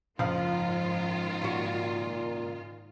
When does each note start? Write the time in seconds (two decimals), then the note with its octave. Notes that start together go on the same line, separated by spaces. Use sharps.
0.19 F#1 G#2 D#3 F3 F4 F5
1.42 A#2 C#4 F#4